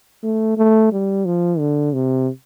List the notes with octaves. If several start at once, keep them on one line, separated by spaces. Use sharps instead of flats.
A3
A3
G3
F3
D3
C3